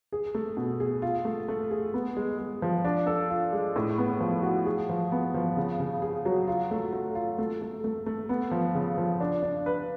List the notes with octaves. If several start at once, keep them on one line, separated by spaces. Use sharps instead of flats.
G#4
A3
B2
G#4
F4
A3
A3
G#4
B3
G#3
G#3
F3
D4
A4
F4
G#3
A2
B3
F3
F#4
G#4
F3
B3
F3
C#3
C#3
G#4
F#3
F4
A3
A3
F4
A3
A3
A3
A3
B3
F3
C#3
F3
D4
D4
B4